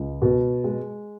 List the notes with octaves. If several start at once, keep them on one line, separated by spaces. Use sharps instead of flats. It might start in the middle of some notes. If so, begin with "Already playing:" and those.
Already playing: C#2
B2
G#3